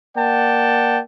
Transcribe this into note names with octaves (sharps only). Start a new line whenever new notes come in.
A#3 D5 F#5 G5 A5